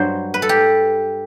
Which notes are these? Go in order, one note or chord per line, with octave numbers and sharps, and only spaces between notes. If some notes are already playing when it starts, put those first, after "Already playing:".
Already playing: G2 F#3 C5
B4
A4
G4